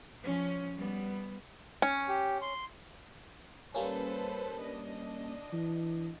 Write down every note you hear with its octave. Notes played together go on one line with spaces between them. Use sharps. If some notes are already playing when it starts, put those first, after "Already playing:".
F3 C#4
G3 B3
C#4
G4
C6
G3 A#3 C#4 A4 B4 C5
D4 D#5
E3